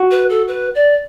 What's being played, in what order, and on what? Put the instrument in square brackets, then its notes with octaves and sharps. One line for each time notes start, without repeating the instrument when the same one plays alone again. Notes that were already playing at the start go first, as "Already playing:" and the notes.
Already playing: [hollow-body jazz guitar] F#4
[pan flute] B4
A4
B4
D5